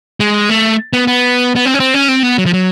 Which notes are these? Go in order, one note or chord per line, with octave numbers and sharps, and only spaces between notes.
G#3
A3
B3
B3
B3
C4
C#4
C4
C#4
C4
B3
F#3
F3
F#3